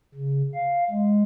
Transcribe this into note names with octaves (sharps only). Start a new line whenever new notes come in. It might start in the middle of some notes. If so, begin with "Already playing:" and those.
C#3
F5
G#3